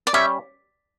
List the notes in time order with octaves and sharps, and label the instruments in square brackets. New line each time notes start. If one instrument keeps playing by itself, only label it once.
[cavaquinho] D5
[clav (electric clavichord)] G3 C#4 G4 C#5 [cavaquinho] E5